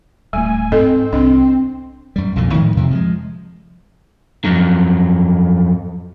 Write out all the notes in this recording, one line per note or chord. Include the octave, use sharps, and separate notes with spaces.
D1 G3 A3 G#5
G#2 C4 A4 D#5
C2 D4 D#5
F#2 G3
B1 F2 A#2 D3
A2 D#3 F3 G#3
F2 C3 E3 F3
F3 G3 G#3
F2 F#3